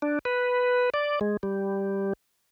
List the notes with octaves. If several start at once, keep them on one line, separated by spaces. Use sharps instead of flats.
D4
B4
D5
G#3
G3